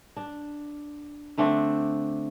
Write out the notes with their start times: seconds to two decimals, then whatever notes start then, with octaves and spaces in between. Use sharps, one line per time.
0.16 D4
1.38 D3 A3 C4 D4